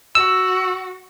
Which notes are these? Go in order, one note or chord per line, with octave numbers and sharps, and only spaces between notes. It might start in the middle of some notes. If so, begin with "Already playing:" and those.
F#4 E6